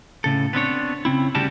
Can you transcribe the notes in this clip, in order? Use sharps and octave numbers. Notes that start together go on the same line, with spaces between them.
A2 C#3 A4
B3 C4 D4 C#5
C#3 C4 E4
D2 C#3 G3 F#4 G4 A5